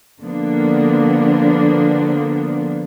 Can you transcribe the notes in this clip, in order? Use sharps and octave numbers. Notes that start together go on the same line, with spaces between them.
D3 F3 A#3 B3 D4